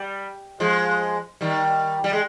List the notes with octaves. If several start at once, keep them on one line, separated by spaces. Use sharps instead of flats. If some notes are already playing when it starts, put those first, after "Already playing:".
Already playing: G3
F3 G#3
D#3 G3
G3
G#3